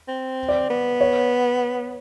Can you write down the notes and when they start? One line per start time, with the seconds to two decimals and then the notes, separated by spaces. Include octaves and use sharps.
0.08 C4
0.49 D5
0.70 B3
1.01 C#5